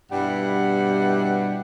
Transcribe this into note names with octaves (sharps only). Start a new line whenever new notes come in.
G2 B2 G3 E4 F#5